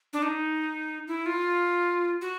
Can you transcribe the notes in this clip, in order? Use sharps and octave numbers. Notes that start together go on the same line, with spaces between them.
D4
D#4
E4
F4
F#4